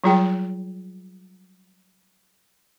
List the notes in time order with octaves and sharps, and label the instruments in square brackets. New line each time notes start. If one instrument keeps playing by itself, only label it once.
[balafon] F#3 G3 F4 G#4 G5